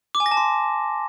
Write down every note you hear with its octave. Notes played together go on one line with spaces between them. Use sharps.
D6
G#5
A#6
A5
C6